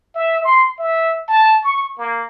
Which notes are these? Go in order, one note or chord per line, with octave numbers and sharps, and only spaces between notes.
E5
C6
E5
A5
C#6
A#3